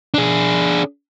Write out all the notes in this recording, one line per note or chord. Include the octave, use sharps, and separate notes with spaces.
D4 G#4